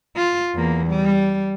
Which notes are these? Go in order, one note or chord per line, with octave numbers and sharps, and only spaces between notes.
F4
E2 A#3
G3